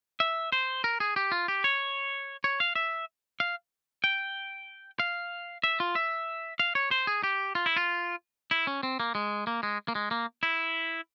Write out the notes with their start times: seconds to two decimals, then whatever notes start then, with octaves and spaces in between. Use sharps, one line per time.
0.20 E5
0.52 C5
0.84 A#4
1.00 G#4
1.16 G4
1.32 F4
1.48 G4
1.64 C#5
2.44 C#5
2.60 F5
2.76 E5
3.40 F5
4.04 G5
5.00 F5
5.64 E5
5.80 F4
5.95 E5
6.60 F5
6.75 C#5
6.91 C5
7.07 G#4
7.24 G4
7.55 F4
7.66 E4
7.76 F4
8.51 E4
8.67 C#4
8.83 C4
9.00 A#3
9.15 G#3
9.47 A#3
9.63 G#3
9.88 A#3
9.95 G#3
10.11 A#3
10.43 E4